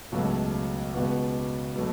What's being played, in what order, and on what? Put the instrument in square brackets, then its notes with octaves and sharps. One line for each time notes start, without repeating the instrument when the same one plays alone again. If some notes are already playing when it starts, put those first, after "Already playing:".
[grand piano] C#2 B2 F#3 A3
C#2 B2 B3 F#4
B2 F#3 A3